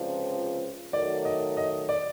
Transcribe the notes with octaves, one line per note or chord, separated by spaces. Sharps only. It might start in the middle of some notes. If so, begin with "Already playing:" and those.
Already playing: C#2 C3 F3 D5
D#3 F#3 A3 D5
D#5
D#5
D5